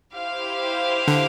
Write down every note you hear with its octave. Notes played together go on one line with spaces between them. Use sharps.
E4 G4 C5 F5
D3